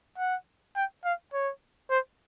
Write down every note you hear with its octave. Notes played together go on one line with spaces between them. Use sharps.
F#5
G5
F5
C#5
C5